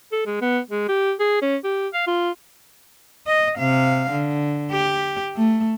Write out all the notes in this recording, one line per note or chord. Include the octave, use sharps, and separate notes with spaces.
A4
G#3
B3
G#3
G4
G#4
C#4
G4
F5
F4
D#5
C3 F5
D3
G4
A3